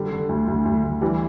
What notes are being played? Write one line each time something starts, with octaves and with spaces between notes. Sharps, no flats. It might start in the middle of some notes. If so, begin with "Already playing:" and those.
Already playing: D3 G3
D3
D2
D2
D2
D2
E3 G3